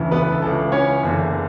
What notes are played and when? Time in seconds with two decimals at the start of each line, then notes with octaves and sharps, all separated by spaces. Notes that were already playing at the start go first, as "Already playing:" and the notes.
Already playing: E1 D2 C#3 E3
0.11 B3 B4
0.22 B4
0.32 A4
0.42 C#2 C#3 E3 A4
0.72 C#4 C#5
1.03 F#1 E2 D3